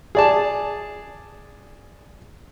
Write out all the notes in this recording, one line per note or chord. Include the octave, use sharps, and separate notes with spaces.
G#4 D5 A5